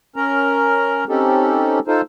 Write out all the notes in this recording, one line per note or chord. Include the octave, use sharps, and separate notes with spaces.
C#4 A#4 A#5
C4 C#4 D#4 G4 A4
D#4 F4 A4 C5